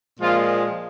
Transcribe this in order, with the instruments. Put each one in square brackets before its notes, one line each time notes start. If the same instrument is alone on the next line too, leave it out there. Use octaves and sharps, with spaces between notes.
[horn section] A#2 F3 G#3 F4